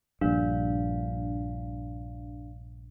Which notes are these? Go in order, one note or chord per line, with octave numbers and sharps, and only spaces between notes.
A#1 G2 D4 F5